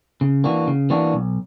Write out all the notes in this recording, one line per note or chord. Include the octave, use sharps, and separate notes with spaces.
C#3
E3 A#3 D4 F#4
C#3
E3 A#3 D4 F#4
B1